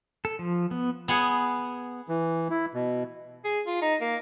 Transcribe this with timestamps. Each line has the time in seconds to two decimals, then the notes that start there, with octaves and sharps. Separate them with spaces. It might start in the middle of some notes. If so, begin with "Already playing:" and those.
0.25 A4
0.39 F3
0.71 B3
1.08 B3 G#4 F#5 G#5
2.08 E3
2.50 E4
2.74 B2
3.44 G#4
3.67 F4
3.82 D#4
4.01 A#3